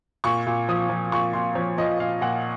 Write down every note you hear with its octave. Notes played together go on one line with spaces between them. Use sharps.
A#2 C#6
A#2
F3 D#6
F3
A#2 C#6
A#2 C6
F3 C#5
F3 D#5
A#2 F5
A#2 F#5